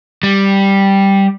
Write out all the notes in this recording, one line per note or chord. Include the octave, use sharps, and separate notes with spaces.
G3